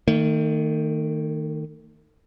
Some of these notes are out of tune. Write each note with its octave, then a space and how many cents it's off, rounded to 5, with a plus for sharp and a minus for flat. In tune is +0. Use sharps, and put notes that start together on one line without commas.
D#3 +0 A3 +45